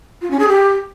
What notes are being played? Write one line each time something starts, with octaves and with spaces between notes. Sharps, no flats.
F4
C#4
G#4
G4